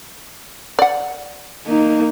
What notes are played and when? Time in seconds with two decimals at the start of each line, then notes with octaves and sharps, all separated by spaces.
0.79 D5 F#5
1.66 A#3 D#4